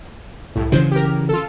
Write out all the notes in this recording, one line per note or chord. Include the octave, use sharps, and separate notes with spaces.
C2 A2
C#3 E3 F#3 C5
G4 A#4
F4 A4